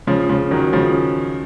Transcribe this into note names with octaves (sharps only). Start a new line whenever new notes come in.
C#3 F3
C#3 F3
D#3 F#3
C#3 F3